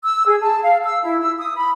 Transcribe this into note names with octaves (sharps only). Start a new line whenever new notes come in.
E6
G#4
A5
F5
E6
E4
E6
D#6
B5